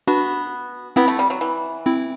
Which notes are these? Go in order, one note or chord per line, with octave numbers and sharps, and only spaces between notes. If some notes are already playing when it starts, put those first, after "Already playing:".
B3 D4 F#4
B3 C4 E4
A3
G3
F#3
E3
C4 E4